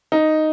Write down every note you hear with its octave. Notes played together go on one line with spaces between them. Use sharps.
D#4